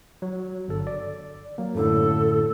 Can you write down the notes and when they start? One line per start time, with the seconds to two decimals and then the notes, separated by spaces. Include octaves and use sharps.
0.22 F#3
0.68 G1 A4
0.87 D5
1.58 F#3 A#3
1.75 F#2 A2 D3 A4